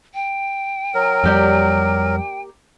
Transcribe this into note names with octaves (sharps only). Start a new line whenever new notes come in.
G5
F#3 A#4
F2 G3 A#3 G4 D5